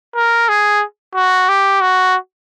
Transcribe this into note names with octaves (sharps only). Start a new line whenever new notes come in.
A#4
G#4
F#4
G4
F#4